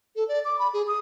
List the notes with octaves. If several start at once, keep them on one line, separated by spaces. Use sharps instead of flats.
A4
D5
D6
B5
G#4
D#6